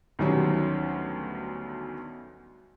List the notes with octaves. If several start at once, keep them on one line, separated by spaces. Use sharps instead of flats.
D2 B2 D#3 F#3 G3 C#4